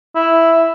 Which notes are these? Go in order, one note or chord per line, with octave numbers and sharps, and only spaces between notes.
E4